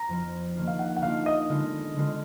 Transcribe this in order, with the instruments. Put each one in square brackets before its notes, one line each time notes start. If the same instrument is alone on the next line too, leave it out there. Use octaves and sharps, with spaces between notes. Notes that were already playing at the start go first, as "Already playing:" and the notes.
Already playing: [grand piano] A#5
[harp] F2 F3 B3 F4
D#3 A#3 D4 F4
[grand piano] F5
F#5
F#5
[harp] D#3 A#3 D4 F4 [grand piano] F5
[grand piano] D#5
[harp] D3 G#3 B3 F4
D3 G#3 B3 F4